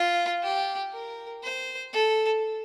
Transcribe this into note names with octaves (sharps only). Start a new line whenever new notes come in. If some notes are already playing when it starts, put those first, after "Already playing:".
Already playing: F4
G4
A#4
C5
A4